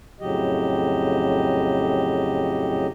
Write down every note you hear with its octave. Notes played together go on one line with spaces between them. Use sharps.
F2 A2 C#3 F#3 G4 D#5